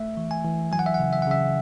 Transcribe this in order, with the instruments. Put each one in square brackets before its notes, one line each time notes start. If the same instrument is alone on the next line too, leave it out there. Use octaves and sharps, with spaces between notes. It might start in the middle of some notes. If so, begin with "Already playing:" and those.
Already playing: [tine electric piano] A3 E5
E3
G#5
E3
F#3 G#5
F#5
E5
F#5
C#3
E5
F#5
C#3 E5